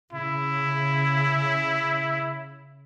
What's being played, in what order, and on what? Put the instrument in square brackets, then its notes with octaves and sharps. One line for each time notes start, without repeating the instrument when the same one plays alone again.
[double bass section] C#3 [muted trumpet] E4